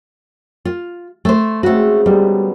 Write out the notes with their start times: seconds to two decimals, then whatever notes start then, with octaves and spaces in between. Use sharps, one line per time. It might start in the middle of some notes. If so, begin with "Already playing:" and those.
0.65 F4
1.25 A3 C5
1.63 C#3 G#3 A3 C4 F#4
2.06 B2 D3 G3 D#4